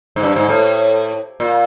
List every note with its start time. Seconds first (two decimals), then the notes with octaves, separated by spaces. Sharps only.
0.16 G#2
0.23 G2
0.36 G#2
0.49 A2
1.40 A#2